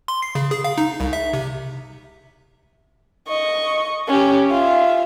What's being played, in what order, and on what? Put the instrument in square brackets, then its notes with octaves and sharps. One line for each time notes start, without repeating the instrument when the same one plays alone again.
[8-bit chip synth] C6
C7
C#3
G#4
F5
D#4
C2
E5
C3
[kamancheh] D#5 C#6
C#4 G4
F4 E5